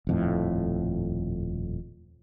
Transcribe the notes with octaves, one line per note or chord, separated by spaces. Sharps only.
D#1 F2 A2